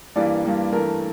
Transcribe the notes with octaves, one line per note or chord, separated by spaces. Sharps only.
G2 E3 G3 A#3 D5
G2 E3 G3 A#3
G2 E3 A3 A#4